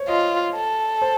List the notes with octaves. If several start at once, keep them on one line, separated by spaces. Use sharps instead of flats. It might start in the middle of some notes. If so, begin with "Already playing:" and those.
Already playing: C5 C#5
F4 D#5
A4
C5